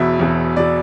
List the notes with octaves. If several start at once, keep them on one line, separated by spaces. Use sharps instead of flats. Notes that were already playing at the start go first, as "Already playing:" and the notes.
Already playing: E1 E2 B2 E5
E1 E2 B2
E1 B2 D5